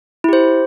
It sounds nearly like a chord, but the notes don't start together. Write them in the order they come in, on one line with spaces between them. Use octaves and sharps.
E4 G4 C5